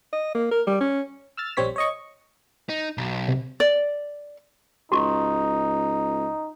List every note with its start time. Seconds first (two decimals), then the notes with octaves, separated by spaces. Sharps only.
0.13 D#5
0.35 A#3
0.51 A#4
0.67 G3
0.80 C#4
1.37 E6 F6 A6
1.57 A#1 G3 C4 C#5 B6
1.76 C#5 D#5 C#6
2.69 D#4
2.98 B1
3.28 C3
3.60 D5
4.92 C#2 D#4 F#4 C#6